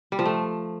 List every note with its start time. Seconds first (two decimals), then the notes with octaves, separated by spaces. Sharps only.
0.12 G3
0.19 F3
0.25 A3